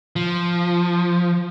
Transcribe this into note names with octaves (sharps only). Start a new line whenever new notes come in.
F3